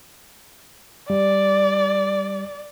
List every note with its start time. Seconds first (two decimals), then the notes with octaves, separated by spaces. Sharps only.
1.10 G3 D5